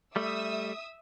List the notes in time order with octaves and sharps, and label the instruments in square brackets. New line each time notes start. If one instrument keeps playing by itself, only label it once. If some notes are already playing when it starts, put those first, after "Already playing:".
[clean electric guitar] G3 A3 [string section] E5 D#6 E6